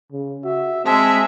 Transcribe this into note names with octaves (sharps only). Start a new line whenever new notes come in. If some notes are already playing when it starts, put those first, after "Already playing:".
C#3
F#4 E5
G#3 C4 E5 A5